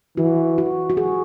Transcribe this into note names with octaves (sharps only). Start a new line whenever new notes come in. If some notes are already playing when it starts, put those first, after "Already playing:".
E3 F#4
F#4
F#4
G#4